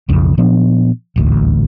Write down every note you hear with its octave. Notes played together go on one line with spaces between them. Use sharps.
B1 F2 C#3
A#2 F3 B3 D4
D#1 A1 D2